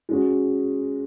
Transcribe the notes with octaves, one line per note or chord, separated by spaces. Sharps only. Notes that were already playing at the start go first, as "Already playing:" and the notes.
G#3 C#4 F#4